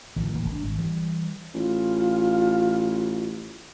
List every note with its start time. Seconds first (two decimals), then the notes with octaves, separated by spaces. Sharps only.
0.16 A1 A2 D#3 F3
0.34 D1 E3 A#3
0.48 G1 D4
0.64 G#1
0.79 E3 G3
1.54 A1 F4